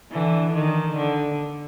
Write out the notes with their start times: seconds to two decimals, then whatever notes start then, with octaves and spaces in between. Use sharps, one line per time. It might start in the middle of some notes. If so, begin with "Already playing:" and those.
0.12 D3 E3
0.54 D#3
0.97 D3